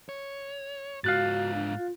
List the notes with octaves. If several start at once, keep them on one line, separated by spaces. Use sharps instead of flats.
C#5
G#2 F4 F#4 F5 F#6 A6
D4
F4